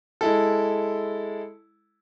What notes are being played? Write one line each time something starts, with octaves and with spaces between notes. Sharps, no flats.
G#3 E4 A4